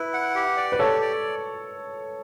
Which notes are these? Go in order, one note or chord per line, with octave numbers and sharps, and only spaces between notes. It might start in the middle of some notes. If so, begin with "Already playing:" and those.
Already playing: E4 B4
F#5
G4
D5
B4
G4 A4 C#5
D5